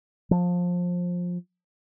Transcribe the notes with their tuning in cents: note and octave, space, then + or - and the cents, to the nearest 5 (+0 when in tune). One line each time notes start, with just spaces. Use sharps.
F3 +20